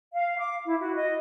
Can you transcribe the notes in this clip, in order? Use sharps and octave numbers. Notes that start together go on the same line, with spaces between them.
F5
D6
E4
F#4
D#5